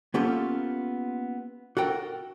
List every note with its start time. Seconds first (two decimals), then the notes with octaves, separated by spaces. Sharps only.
0.14 A#3 B3 C#4 F4 G4 A4
1.77 F#4 A4 A#4 G5